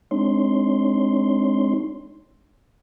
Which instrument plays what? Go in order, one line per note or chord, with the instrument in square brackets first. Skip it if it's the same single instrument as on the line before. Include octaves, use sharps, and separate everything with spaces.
[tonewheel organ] G#3 C4 D4 D#4 C#5 C6